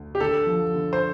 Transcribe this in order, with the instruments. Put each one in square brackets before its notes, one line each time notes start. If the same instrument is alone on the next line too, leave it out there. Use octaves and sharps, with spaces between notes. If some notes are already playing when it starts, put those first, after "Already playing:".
Already playing: [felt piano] D2
[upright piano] G4
[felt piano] D3 [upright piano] A4
[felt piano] F3
D3
[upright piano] C5